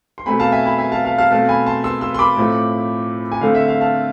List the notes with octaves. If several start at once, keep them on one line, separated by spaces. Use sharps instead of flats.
C6
B2 A3 C4 G#5 B5
F5 A5
E5 G#5
G#5 B5
E5 G#5
F5 A5
F5 A5
F5 A5
B2 A3 C4 F5 A5
G#5 B5
A5 C6
C6 E6
C6 E6
C6
B5 D6
A2 F3 A3 C4
G#5
D3 A3 C4 F5
E5
F5
F5 A5